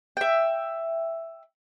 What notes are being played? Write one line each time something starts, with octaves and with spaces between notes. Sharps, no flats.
E5 G5